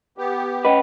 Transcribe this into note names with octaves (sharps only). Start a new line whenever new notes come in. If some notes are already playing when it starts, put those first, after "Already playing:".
B3 G4
C#4 B4 D#5 F#5 G5